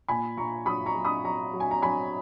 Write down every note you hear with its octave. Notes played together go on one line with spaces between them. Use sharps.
A#2 G#5 B5
A#2 A#5 C#6
F#3 B5 D#6
A#5 C#6
F#3
B5 D#6
F#3 A#5 C#6
F#3
G#5
A#5
F#3 G#5 B5